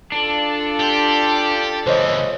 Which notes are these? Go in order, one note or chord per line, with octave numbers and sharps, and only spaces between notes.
D4 F4 A4 D5
G4
C#2 E3 C5 C#5 D#5